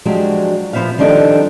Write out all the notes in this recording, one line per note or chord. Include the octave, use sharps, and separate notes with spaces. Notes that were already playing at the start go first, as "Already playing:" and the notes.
F3 F#3 G#3 D4 F#4 G4
A#2 F3 B3 C5 E5 F5
D#3 F3 G3 D4 D#4 A4